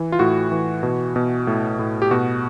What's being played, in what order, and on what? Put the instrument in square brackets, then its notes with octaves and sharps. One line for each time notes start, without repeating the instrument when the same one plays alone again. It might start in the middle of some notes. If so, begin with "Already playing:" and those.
Already playing: [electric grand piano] E3
F4
A2 F#4
E3
B2
B2
A2
A2
G4
B2 F#4